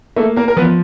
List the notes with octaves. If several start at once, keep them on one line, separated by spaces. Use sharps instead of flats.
A3 A#3 A4
A#3 A#4
A#4
F3 B3 B4